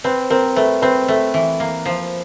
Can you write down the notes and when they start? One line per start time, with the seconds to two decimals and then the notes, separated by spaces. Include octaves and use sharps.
0.04 C4 B4
0.30 C4 A#4
0.56 A3 B4
0.82 C4 B4
1.08 A3
1.34 E3
1.60 A#3
1.85 F3